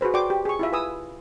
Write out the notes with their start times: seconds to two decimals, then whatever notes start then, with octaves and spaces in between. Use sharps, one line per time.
0.01 F#4 G#4 B4 C5
0.14 F#4 D5 G5 C6 D6
0.30 G4
0.45 G#4 C#6
0.59 E4 F4 E5
0.73 B4 G#5 D#6 E6